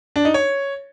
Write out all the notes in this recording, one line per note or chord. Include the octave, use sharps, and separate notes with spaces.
D4
D#4
C#5